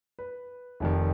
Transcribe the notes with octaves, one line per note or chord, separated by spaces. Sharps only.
B4
F1 F2 D#3